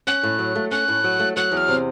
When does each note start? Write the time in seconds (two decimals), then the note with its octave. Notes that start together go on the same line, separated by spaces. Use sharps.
0.07 C#4 F#6
0.23 A2
0.39 F#3
0.56 A3
0.71 C#4 F#6
0.88 A2
1.04 F#3
1.20 A3
1.36 F#3 F#6
1.52 E2
1.57 F6
1.68 C3